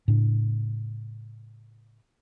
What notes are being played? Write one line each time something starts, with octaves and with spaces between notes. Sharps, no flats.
A2 C#3 D4